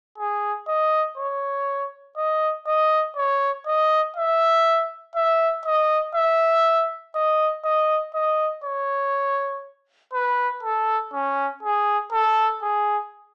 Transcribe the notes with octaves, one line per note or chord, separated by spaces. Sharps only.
G#4
D#5
C#5
D#5
D#5
C#5
D#5
E5
E5
D#5
E5
D#5
D#5
D#5
C#5
B4
A4
C#4
G#4
A4
G#4